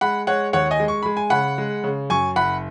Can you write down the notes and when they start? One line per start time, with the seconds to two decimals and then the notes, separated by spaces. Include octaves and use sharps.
0.01 G#3 F#5 B5
0.27 G#3 C#5 F#5
0.53 D#2 C#5 F#5
0.71 D#5 G#5
0.80 G#3
0.88 C#6
1.03 G#3 B5
1.17 G#5
1.30 C#3 F#5 B5
1.58 G#3
1.84 C#3
2.10 F#2 G#5 C#6
2.36 F#1 F#5 B5